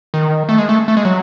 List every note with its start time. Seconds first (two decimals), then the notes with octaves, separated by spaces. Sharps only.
0.14 D#3
0.49 A3
0.58 G#3
0.69 A3
0.88 A3
0.97 G#3
1.05 F#3